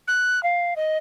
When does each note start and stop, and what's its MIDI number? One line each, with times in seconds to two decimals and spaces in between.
0.08 0.42 90
0.43 0.74 77
0.76 0.98 75